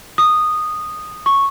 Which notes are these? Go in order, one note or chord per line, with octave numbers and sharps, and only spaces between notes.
D#6
C#6